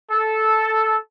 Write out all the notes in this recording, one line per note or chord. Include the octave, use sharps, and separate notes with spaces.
A4